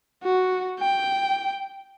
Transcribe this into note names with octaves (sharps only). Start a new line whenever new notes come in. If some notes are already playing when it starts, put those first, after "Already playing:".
F#4
G5